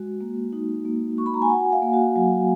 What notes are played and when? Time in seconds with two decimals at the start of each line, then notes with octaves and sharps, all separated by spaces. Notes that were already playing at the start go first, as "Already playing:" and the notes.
Already playing: G#3 F#4
0.21 A#3
0.53 D#4
0.85 A#3
1.18 F#4 C#6
1.26 B5
1.34 A#5
1.42 G#5
1.50 F#4 F#5
1.72 F5
1.82 A#3
1.93 F#4
2.16 F#3